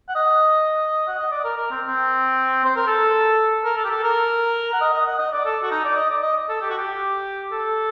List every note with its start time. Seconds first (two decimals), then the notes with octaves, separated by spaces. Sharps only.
0.09 F#5
0.16 D#5
1.08 F#5
1.19 D#5
1.31 D5
1.44 A#4
1.57 A#4
1.71 C4
1.87 C4
2.65 C5
2.76 A#4
2.87 A4
3.65 A#4
3.77 A4
3.84 G4
3.90 A4
4.03 A#4
4.74 F#5
4.81 D#5
4.94 D#5
5.06 F#5
5.19 D#5
5.33 D5
5.46 A4
5.63 F#4
5.71 D#4
5.85 D5
5.97 D#5
6.10 D5
6.23 D#5
6.49 A4
6.61 G4
6.70 F#4
6.78 G4
7.52 A4